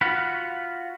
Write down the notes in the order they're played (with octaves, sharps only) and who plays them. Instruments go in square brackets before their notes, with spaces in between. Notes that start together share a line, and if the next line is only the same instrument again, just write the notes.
[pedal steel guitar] F4 F#4 F#5 B5